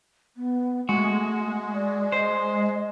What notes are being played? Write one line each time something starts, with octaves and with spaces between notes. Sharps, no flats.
B3
G#3 A3 F#4
D5
C5 D#5